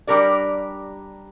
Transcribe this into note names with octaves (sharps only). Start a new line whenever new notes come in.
G3 D4 G4 A#4 D5